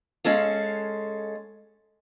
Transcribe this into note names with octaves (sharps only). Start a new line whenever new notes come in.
G#3 C#4 A4 F5